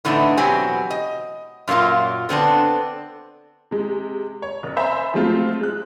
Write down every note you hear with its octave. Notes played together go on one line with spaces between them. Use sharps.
A2 D3 E3 A3 B3 D#4
E2 B2 F#3 C4 G4 G#5
D#5
F#2 A#2 F#3 A#3 F4
D3 B3 C4 D4
C3 G#3
C#5
F#1
C5 E5 G#5 A#5 B5
F3 F#3 G#3 A3 C4 F4
G#3 F#6